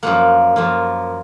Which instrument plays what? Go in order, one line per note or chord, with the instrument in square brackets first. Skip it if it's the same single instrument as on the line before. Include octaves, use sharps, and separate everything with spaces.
[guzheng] F#2 F3 A#3 F#5
F#2 F3 A#3